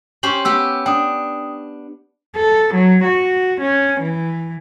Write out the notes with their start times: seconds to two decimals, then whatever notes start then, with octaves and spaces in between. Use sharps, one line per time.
0.23 C#4 G4 C5 C#6 F#7
0.45 B3 G4 E6
0.86 D4 G5 D#6
2.35 A4
2.74 F#3
3.04 F#4
3.61 C#4
4.00 E3